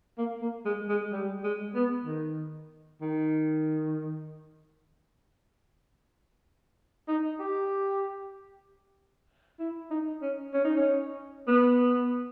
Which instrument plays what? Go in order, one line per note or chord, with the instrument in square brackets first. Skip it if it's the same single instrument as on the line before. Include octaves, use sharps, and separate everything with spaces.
[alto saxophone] A#3
A#3
G#3
G#3
G3
G#3
B3
D#3
D#3
D#4
G4
E4
D#4
C#4
C#4
D#4
C#4
B3